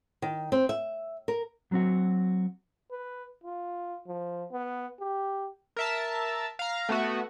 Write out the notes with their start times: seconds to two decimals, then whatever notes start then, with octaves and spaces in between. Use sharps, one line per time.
0.22 D#3
0.52 C4
0.69 E5
1.28 A#4
1.72 F#3 C4 F#4
2.91 B4
3.44 F4
4.07 F3
4.52 B3
5.00 G4
5.77 A#4 E5 A5
6.59 F5 A#5
6.89 A3 B3 F#4